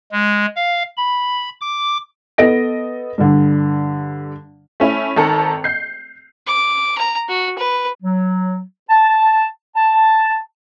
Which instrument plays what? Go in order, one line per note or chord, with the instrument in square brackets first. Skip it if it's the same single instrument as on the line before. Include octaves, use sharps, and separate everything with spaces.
[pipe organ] G#3
F5
B5
D6
[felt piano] B3 A4 D#5 A#6 D7
G2 D3
[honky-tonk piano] A3 C#4 E4
G#1 D#3 A4 A5 A#5 C#7
G6 C7
[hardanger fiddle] D6
A#5
F#4
B4
[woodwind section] F#3
A5
A5